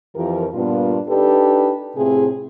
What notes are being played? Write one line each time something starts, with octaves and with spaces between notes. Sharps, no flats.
F2 E3 F3 G4 A#4
G2 A#2 B3 D4 F4
D4 D#4 G4 A4 B4
A2 C3 C4 E4 F4 G#4